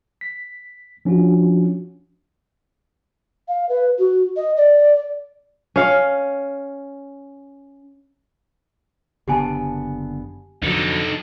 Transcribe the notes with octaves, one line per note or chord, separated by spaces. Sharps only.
B6
F3 C#4 D4 F4 F#4
F5
B4
F#4
D#5
D5
C#4 F5
F#1 D3 B3 G4 G#5 A5
F2 D3 F#3 D#4 A4